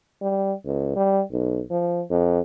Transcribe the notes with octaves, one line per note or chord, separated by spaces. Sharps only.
G3
C#2
G3
B1
F3
F2